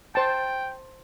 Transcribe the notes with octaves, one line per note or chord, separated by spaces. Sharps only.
C5 G5 A5